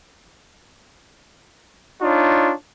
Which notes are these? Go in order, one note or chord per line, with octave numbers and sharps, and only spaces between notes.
D4 D#4 F4 C#5